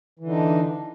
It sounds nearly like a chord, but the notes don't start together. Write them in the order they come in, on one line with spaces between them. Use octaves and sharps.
E3 D3 D#4 D4